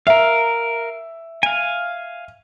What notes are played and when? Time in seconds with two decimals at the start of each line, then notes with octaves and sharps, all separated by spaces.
0.07 A#4 E5 F5
1.43 F5 G#5